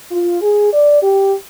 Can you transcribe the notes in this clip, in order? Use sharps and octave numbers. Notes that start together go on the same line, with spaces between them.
F4
G#4
D5
G4